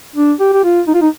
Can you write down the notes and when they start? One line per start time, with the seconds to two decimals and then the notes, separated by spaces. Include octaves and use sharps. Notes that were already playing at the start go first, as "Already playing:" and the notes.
0.16 D4
0.40 G4
0.53 G4
0.64 F4
0.88 D#4
0.94 F4
1.02 D#4